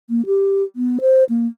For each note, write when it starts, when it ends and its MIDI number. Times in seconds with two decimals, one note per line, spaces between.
0.10 0.25 58
0.26 0.63 67
0.76 0.98 59
1.01 1.24 72
1.29 1.47 58